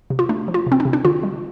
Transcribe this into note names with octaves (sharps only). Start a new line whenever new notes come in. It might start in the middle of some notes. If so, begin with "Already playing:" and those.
C3
F4
A3 D4
F3
F4
C3
C4
D4
C3
D4
D3 F4
G3